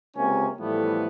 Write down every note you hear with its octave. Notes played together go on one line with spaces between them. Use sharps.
C#2 C3 A#3 C#4 G#5
A2 E3 F3 G3 A3 B3